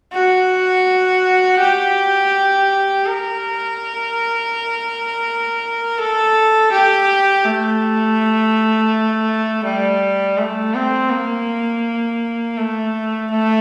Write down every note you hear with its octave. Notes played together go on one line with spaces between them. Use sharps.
F#4
G4
A#4
A4
G4
A3
G3
A3
C4
A#3
A3
A3